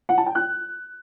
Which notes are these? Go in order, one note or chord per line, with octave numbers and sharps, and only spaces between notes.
F#5
A5
G5
F#6